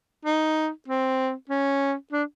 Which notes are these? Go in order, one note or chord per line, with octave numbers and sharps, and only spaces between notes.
D#4
C4
C#4
D4